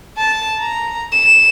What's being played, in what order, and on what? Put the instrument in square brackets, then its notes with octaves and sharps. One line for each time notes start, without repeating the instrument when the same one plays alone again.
[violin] A5
A#5
E7